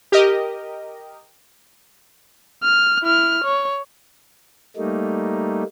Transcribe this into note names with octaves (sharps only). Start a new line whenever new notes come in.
G4 A#4 D#5
F6
E4 F6
C#5
G3 A3 A#3 D#4